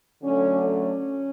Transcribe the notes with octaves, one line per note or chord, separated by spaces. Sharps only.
D3 F#3 A3 C#4
C#4